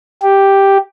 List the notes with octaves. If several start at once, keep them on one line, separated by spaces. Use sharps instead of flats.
G4